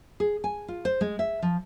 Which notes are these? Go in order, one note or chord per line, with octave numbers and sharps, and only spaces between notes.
G#4
G#5
F4
C5
G#3
E5
F3